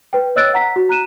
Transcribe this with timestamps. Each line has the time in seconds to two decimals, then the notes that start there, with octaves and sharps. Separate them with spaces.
0.13 B4 G5
0.36 C#5 D#5 E6 F#6 A6 D7
0.54 F#5 A#5 B6
0.76 F#4
0.89 A#5 F#6 D#7 E7